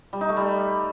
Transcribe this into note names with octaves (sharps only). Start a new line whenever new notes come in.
G3
D#4
A3
G3